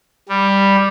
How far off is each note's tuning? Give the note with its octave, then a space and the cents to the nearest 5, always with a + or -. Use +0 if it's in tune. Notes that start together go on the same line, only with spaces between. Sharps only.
G3 +5